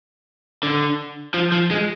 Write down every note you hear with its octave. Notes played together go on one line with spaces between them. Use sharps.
D3
F3
F3
G#3